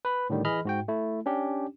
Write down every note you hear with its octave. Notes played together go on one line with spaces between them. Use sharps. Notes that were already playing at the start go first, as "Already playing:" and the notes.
B4 B5
A2 D3 D#3 G3
E3 G#4 D#5 B5 F6
G#2 F#4 G5
A3 E4
C#4 D4 G4